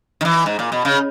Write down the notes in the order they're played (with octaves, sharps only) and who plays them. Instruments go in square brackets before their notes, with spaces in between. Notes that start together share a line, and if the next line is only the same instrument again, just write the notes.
[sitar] D#3
E3
G#2
A#2
B2
C#3